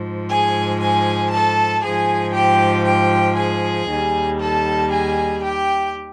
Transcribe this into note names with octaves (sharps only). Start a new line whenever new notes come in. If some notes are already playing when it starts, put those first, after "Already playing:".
Already playing: G#2 F3
G#4 G#5
G#4 G#5
A4 A5
G#2 F3 G#4 G#5
G4 G5
G4 G5
G#4 G#5
D#2 D#3 G3
A4 A5
G#4 G#5
G4 G5